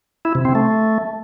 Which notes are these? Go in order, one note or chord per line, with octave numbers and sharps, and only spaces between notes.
E4
C3
C4
A3